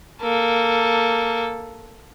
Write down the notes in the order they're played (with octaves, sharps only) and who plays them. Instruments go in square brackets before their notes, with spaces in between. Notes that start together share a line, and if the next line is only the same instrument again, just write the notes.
[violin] A#3 A4